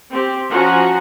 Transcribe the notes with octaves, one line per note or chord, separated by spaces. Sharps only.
C4 G4
F3 C#4 F#4 F#5 G#5 A#5